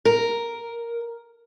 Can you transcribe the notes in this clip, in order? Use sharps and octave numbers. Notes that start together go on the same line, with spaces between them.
A#4